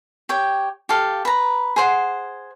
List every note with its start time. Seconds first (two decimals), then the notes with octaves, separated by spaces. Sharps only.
0.29 G4 C#5 G5
0.89 G4 A4 F5
1.25 B4 A#5
1.76 G#4 C5 F#5